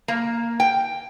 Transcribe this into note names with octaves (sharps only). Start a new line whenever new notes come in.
A#3
G5